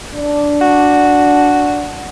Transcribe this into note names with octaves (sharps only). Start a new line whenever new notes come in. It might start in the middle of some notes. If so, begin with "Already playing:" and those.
D4
F#4